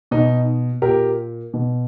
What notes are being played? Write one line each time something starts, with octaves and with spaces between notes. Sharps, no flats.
B2 D#4
A#2 G4 A#4
B2